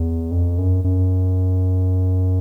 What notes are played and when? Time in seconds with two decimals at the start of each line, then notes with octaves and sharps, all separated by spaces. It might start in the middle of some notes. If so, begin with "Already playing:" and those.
Already playing: E2
0.31 F2
0.58 F#2
0.84 F#2